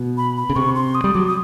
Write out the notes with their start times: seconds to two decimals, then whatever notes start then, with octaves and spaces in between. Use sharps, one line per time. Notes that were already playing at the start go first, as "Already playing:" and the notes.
Already playing: B2
0.17 B5
0.37 B5
0.50 C#3
0.56 C3 C#6
0.75 C6
0.95 D#6
1.04 G3
1.15 F#3 D6
1.27 D#6